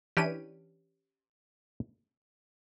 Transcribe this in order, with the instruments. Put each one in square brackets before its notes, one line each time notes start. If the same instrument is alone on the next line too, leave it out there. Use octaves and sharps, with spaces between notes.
[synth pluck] E3 D4 D#7 [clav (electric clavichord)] C#4 G4 B4